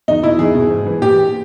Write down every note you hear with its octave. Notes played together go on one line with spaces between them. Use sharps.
E2 D#4
B2 E4
E2 G#4
B2
G#2
E3
A#2 G4